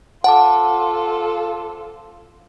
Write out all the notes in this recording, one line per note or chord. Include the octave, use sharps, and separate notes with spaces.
F4 A4 C5 F#5 A5 D6